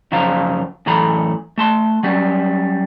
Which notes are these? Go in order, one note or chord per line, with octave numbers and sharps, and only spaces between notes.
F#2 C#3 F3 C5 F5 A#5
F#2 A2 E3 A4 A#5 B5
A3 A5 C6
F#3 G3 C#4